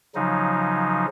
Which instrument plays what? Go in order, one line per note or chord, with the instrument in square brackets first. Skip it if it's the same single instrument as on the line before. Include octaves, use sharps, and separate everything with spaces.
[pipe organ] C#3 F3 F#3 D#4